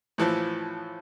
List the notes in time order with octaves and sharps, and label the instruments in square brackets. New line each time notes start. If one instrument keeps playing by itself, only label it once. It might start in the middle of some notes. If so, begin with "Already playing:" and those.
[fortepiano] A2 E3 F3